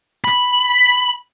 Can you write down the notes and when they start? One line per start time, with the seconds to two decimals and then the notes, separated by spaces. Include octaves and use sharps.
0.24 B5